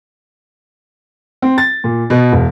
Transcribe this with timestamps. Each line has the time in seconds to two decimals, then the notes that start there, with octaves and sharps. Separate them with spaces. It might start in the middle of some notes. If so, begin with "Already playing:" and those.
1.42 C4
1.58 A6
1.84 A#2
2.10 B2
2.32 E1